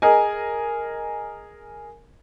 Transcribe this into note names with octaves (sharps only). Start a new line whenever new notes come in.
G#4 A#4 D#5 G#5